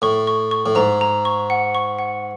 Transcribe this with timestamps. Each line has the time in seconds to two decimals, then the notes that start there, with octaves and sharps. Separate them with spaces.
0.02 A2 C#6
0.27 C#6
0.51 C#6
0.66 A2
0.75 G#2 A#5
1.01 A#5
1.25 C#6
1.50 F#5
1.75 C#6
1.99 F#5